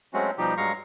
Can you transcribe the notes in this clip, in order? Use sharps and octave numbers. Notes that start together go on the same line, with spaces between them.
F#3 G#3 A3 C4 C#4 F#4
B2 F3 G3 D#4 G4
G2 F#3 G#3 F5 A#5 C#6